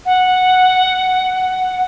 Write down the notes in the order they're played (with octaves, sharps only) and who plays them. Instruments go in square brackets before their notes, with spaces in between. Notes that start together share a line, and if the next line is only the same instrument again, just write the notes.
[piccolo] F#5